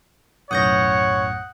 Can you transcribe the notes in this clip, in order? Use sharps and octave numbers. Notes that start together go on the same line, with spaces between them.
B1 F#2 A2 C#5 F#5 D#6 G6 A#6